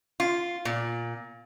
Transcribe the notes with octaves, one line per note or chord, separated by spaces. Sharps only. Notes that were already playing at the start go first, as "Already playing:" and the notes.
F4
A#2